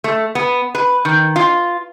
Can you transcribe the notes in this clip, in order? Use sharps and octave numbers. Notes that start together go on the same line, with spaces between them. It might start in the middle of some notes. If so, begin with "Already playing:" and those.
A3
B3
B4
D#3
F4